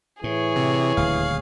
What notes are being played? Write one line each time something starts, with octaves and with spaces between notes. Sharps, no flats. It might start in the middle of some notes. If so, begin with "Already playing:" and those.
A2 E3 G#4 C#5
C3
D#1 D2 F5